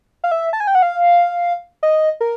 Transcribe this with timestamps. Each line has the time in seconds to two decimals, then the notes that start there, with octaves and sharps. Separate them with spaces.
0.24 F5
0.32 E5
0.53 A5
0.60 G#5
0.67 G5
0.75 F#5
0.82 F5
1.83 D#5
2.21 A#4